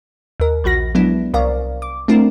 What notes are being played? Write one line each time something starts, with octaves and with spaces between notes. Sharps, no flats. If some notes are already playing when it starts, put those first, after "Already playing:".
D#2 A#4
A#1 F3 F#4 A#6
F#3 G#3 B3 D4 E4
C2 A#4 D5 F5
D6
A3 C4 D4 E4 A#4